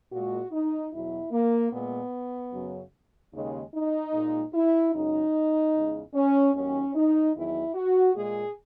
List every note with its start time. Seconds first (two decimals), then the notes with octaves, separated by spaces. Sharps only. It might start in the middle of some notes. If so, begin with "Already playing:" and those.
0.12 A#2 G#3 F#4
0.52 D#4
0.92 E2 B2 F#3 E4
1.32 A#3
1.72 A#2 G#3 B3
2.53 F#2 C#3 F#3
3.34 D#2 C#3 G#3
3.73 D#4
4.14 A#2 G#3
4.54 E4
4.93 F#2 C#3 G#3 D#4
5.74 E2 C#3 G#3
6.14 C#4
6.54 D#2 D#3 F#3 C#4
6.95 D#4
7.35 E2 D#3 F#3 E4
7.75 F#4
8.16 A#2 G#3 G#4